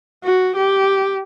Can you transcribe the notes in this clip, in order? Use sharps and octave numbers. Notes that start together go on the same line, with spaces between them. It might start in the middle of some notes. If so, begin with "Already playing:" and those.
F#4
G4